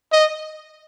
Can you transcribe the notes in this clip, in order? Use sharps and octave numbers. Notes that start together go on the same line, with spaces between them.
D#5